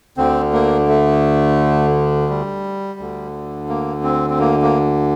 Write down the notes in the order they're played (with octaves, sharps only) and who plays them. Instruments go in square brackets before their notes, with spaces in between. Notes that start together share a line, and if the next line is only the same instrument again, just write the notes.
[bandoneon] D2 D3 C4
A#3
A3
G3
D2 D3
A#3
C4
C4
A#3
A#3